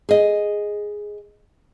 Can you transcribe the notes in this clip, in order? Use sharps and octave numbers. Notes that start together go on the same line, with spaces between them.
G#4 D#5